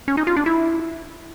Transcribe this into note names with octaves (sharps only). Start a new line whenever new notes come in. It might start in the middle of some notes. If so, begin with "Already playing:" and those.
C#4
D#4
F4
D4
E4